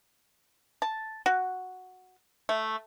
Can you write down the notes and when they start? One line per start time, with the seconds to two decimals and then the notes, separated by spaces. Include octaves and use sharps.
0.82 A5
1.26 F#4
2.49 A3